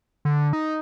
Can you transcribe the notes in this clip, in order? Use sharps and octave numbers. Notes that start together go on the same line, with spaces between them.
D3
D#4